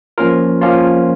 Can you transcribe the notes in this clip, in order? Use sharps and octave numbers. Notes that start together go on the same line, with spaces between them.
F3 A#3 C#4 F4 A#4
F3 A#3 C#4 F4